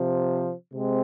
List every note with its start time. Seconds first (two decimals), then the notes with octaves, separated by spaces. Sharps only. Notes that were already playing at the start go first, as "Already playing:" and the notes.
Already playing: C3 F3
0.73 C3 G#3 C4